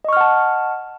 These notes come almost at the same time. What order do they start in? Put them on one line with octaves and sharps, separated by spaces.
D#5 C#6 F6 F#5 A5